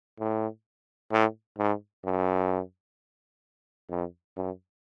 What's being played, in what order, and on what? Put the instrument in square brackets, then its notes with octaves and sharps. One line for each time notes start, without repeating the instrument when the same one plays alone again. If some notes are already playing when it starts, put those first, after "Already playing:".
[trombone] A2
A2
G#2
F#2
F2
F#2